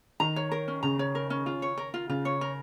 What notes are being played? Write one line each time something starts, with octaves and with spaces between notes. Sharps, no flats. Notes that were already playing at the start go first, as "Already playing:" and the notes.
D#3 A#5
C#5
A#4
C#4
C#3 A#5
C#5
A#4
C#4
F4
C#5
A#4
F4
C#3 F4
C#5
A#4